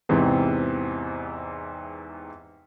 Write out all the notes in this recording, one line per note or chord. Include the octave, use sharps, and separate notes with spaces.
E2 G#2 C3 E3 C4